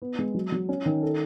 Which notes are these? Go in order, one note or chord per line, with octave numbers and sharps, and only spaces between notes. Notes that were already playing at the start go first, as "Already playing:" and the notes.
B3
G#3
F#3
F#3
C#4
D#3
A4